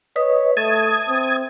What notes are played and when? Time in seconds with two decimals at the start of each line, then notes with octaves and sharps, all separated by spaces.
0.16 B4 C#5 D#5
0.57 A3 E5 A5 D#6 G#6
1.08 C4